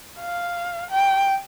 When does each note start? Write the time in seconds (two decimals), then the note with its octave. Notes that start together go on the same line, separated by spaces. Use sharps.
0.20 F5
0.90 G5